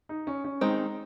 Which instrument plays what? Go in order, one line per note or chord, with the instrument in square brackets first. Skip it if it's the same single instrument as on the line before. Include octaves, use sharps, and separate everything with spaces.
[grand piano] D#4
C#4
C#4
[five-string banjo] D#3 G#3 C4 [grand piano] D#4